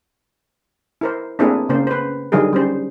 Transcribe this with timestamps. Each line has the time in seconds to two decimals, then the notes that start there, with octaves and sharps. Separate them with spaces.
1.01 E4 A#4 C5
1.39 A3 A#3 C4 D4 E4 G#4
1.69 C#3 A#3 C5
1.87 B4 C5
2.32 D3 F#3 G3 D#4 G#4 A#4
2.53 G3 C#4 C5